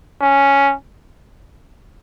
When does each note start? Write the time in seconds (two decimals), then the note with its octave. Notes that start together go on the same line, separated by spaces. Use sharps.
0.21 C#4